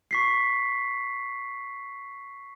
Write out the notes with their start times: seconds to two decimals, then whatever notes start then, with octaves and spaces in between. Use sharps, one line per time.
0.11 C#6 B6 C7